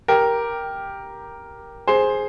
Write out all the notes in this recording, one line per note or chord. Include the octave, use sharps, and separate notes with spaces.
G4 A#4
G#4 C5